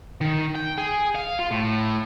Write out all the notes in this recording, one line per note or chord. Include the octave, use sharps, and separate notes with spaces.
D#3
G5
G#4
F5
F4
A2